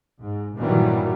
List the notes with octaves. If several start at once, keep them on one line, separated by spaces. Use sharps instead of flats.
G#2
G2 A#2 D#3 E3 F#3 G3